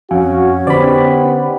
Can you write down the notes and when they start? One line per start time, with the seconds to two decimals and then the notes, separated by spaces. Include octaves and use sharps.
0.11 F2 C#4 F#4 F5 G#5
0.67 D3 B3 D#4 G4 C5 D5 B5